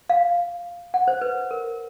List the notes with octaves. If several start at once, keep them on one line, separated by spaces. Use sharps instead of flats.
F5
F#5
C5
B4
A#4